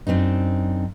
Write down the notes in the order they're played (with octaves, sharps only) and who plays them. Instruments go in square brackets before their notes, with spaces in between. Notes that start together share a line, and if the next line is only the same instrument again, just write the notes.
[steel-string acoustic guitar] F#2 C4 D4 D#4